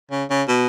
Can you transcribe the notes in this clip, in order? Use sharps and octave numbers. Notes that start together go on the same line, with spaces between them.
C#3
C#3
B2